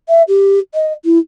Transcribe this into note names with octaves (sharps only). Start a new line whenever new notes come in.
E5
G4
D#5
E4